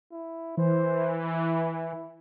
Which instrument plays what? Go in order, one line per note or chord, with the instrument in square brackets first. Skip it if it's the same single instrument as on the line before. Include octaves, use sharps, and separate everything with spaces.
[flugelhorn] E4
[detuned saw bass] E3 [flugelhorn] C5
[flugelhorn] E4